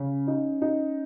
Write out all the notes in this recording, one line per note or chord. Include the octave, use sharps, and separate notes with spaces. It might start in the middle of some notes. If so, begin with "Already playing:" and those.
Already playing: C#3 C#4
D#4
D#4